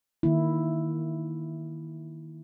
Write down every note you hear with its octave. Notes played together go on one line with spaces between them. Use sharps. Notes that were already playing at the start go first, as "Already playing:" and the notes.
D#3 A#3 E4